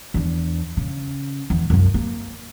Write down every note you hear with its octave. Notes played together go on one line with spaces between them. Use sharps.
E2 D4
C#3
E2
C2 F#2
A#3